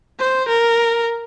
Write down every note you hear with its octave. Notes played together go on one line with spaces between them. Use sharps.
C5
A#4